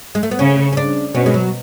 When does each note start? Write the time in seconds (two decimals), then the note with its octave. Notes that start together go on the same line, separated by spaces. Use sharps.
0.15 G#3
0.23 A3
0.31 B3
0.39 C#3 C#4
0.72 C#4
0.77 D4
1.15 B2 C#4
1.26 G#3
1.34 F#3